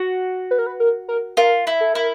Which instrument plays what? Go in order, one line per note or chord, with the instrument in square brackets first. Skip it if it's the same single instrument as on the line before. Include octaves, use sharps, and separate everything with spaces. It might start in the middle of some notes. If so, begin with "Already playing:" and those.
Already playing: [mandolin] F#4
[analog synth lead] B4
A#4
B4
A#4
A#4
[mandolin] F4 [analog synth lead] A#4
[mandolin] E4
[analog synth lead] A4
[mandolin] E4 [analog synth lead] A#4